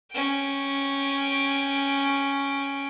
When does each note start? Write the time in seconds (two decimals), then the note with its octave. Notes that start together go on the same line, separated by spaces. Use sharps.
0.12 C#4 G5